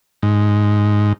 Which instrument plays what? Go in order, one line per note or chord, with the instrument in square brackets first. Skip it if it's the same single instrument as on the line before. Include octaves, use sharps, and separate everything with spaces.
[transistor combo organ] G#2